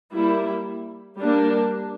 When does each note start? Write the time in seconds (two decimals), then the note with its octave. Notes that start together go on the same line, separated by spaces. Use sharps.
0.14 G3 A#3 E4
1.19 G3 A#3 D4